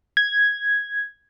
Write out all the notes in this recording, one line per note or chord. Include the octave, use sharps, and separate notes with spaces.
G#6